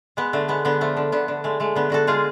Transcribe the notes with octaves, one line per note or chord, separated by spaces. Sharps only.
G#3 B3
D3 A3
G#3 B3
D3 B3
F3 A3
D3
D3 B3
D3
G#3 A3
G#3 A3
D3 B3
D3 F#4 A4
G#3 F4 G#4